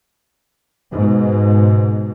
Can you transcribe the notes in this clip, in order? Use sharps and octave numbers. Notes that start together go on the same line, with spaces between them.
G#2 B2